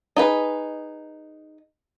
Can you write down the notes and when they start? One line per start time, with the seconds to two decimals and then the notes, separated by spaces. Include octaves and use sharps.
0.17 D#4 G#4 B4